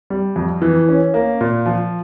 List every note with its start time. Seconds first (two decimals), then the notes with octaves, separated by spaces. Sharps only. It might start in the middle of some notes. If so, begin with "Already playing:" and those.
0.10 G3
0.36 F2
0.62 E3
0.89 C#4
1.14 A#3
1.41 A#2
1.66 F3